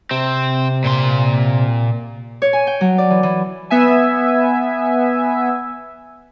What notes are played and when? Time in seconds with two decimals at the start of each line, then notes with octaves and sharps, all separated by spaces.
0.11 C3 C4
0.84 A#2 C6
2.42 C#5
2.53 G#5
2.67 G5
2.81 F#3
2.98 D5
3.10 E3
3.23 E3
3.70 B3 E5 G#5